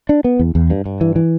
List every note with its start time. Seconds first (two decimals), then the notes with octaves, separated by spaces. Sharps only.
0.09 D4
0.24 B3
0.39 E2
0.55 E2
0.70 G2
0.86 G2
1.01 E3
1.16 E3